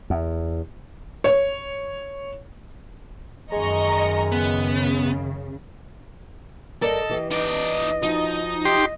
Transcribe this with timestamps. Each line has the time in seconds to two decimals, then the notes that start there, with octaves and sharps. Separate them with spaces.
0.10 E2
1.24 C#5
3.52 F#2 D#3 G#3 D#5 A#5 C#6
4.32 C#3 B3
6.82 G2 A4 A#4 D5 D#5
7.09 E3 G4
7.31 D#4 D5 D#5
8.03 F3 D#4 F#4
8.65 G4 D#5 C6